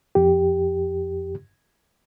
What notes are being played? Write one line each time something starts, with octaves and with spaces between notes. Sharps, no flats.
F2 G4